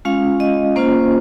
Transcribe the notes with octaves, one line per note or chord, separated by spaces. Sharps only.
G#3 C#4 F4 F5
D#5
A#3 C#4 F4 C5